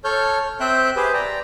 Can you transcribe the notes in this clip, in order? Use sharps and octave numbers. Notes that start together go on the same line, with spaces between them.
A4 C#5 F6 G6
C4 C5 E5 G5 F#6 G6
G4 G#4 B4 C5
D5 G5 A#5